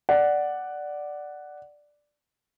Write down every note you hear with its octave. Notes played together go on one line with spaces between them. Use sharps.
D5 F#5